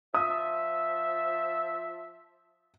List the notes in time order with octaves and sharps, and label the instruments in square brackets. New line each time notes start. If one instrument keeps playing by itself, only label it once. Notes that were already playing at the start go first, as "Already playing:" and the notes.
[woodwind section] F3 E5 [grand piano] D#6